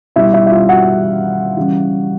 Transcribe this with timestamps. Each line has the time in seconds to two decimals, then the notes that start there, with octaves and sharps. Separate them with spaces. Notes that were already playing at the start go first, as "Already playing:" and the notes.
0.16 B2 G3 E4 E5
0.34 E4 E5
0.47 E5
0.51 F4 F5
0.69 F#4 F#5
1.57 C#3 E3 G3